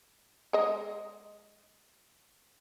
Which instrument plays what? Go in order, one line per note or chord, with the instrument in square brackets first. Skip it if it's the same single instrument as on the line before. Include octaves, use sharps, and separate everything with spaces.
[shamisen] G#3 D#5